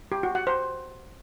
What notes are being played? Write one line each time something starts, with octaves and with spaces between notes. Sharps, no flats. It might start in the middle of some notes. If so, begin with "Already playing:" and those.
G4
F#4
F#5
C5